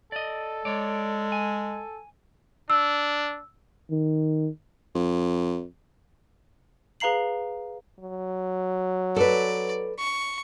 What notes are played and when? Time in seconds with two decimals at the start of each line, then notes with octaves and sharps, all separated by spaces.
0.12 A4 D5 D#5
0.65 G#3 C#5 D5
1.32 G#5
2.70 D4 E6
3.91 D#3
4.95 F2
7.00 G#4 B4 F5 A#5 C7 F#7
7.99 F#3
9.16 A4 B4 D5
9.99 C#6